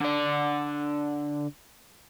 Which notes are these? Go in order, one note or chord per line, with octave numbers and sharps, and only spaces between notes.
D3 D5